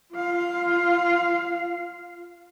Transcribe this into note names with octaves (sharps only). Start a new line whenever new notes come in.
F4 F5